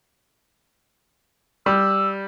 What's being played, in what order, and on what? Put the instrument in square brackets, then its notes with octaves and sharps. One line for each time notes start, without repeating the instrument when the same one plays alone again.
[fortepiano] G3 [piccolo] E6